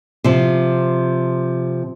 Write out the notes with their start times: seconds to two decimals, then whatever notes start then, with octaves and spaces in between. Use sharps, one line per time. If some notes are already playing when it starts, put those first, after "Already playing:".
0.24 C3 F3